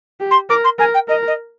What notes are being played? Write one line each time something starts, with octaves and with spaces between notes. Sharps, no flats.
G4
C6
A#4 D6
C6
A#4 G#5
G5
A#4 D#5
D#5